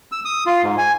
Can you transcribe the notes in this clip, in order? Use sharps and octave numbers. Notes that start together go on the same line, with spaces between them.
E6
D#6
F4
G#2
G#5